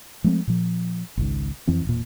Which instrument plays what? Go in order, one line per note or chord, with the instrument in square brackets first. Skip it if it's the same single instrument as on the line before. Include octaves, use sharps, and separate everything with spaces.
[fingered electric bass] F3 G#3 A3 C4
A#2 F3
G#1 C#2 G#2
F2 E3 C4
E1 A#2